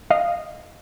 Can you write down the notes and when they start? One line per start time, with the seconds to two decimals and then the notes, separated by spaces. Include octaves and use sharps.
0.10 D#5 F5